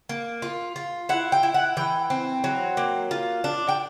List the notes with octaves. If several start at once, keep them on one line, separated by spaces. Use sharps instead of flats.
A#3
F4
F4
E4 F#5
G5
E4
F#5
E3 G5
C4
F#3
A#3
F4
D4
G5